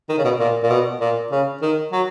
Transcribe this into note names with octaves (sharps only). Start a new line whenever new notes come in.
D#3
C#3
B2
A#2
A#2
B2
A#2
C#3
D#3
F#3